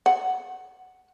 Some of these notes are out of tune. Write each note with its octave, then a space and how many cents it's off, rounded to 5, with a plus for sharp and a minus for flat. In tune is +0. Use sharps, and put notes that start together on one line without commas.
F#5 +5